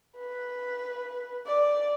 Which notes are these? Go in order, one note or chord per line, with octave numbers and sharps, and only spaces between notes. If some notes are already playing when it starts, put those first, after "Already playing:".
B4
D5